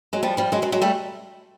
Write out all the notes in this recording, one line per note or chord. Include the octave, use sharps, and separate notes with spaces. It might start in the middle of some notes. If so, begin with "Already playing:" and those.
F#3 G#3
F3 G3
F3 G3
F#3 G#3
F#3 G#3
F#3 G#3
G3 A3